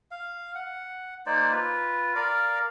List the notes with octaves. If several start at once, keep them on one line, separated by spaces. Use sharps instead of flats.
F5
F#5
A#3 D#4 C5 D5
F4 B4
A#4 D5 F5